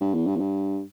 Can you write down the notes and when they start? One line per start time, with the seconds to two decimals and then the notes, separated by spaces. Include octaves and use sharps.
0.01 G2
0.14 E2
0.27 G2
0.36 E2
0.40 G2